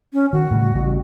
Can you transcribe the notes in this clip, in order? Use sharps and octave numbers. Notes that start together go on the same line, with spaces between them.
C#4
D#3 F#4
A2 C#3 G3
A1 C#3 G3